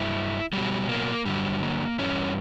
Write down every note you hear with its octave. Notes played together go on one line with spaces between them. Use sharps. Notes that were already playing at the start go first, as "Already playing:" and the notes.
Already playing: G2 F#3 E4
B2 F#3 G3
A#3
G2 D3 F#3 G3
A#3
G2 E3 G3 C#4